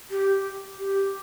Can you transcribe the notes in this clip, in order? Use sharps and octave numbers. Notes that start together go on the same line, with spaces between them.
G4
G4